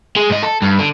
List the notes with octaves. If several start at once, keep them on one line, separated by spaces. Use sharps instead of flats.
G#3
G#2 D#5
A4
G2
D3